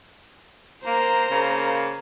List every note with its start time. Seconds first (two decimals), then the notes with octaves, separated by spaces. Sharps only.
0.86 A#3 C5 A#5
1.31 C#3 A#3